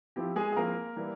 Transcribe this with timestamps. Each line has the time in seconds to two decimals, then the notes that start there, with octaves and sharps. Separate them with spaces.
0.16 F3 C4 E4 G4
0.36 G#3 G#4
0.52 G#4
0.57 F3 A#3 C4 E4 A#4
0.96 E3 G3 A#3 E4